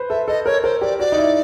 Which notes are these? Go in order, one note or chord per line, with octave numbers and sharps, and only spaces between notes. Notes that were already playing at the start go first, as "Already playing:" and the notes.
Already playing: B4 C5
A4 E5
A4 D#5
A#4 C#5
A#4 C5
G4 D5
F#4 D5
D#4
E4